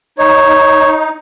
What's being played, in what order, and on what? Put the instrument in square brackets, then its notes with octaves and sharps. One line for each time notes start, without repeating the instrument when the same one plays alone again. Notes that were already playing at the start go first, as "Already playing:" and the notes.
[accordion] D#4 [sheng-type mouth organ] C#5